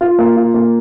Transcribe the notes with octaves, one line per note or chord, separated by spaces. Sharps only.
F4
A#3
F4
A#3